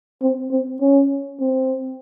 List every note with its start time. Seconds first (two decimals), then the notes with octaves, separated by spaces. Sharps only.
0.22 C4
0.51 C4
0.81 C#4
1.40 C4